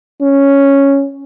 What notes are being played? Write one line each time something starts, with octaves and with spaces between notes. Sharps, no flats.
C#4